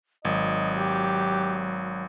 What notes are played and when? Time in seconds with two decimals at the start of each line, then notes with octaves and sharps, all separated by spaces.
0.25 G#1 F#3 D#5
0.77 G4